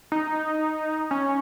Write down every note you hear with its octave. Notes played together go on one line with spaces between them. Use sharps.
D#4
C#4